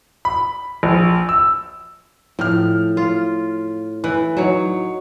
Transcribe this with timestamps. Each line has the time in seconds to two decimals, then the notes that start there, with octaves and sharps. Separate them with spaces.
0.25 B5
0.83 A#1
1.29 E6
2.39 A2 F3 F6
2.97 F4
4.04 E3 F#6
4.37 F#3 D#4 C#5